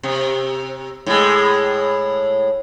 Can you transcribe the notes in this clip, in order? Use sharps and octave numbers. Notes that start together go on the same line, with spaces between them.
C3
A2 G#3